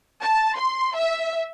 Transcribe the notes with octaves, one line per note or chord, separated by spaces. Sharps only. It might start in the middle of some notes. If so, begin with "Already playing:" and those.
A5
C6
E5